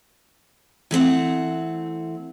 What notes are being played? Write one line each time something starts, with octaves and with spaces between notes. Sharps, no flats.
E3 A3 C4 F#5